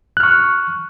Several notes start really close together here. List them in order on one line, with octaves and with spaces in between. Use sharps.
F#6 F6 C#6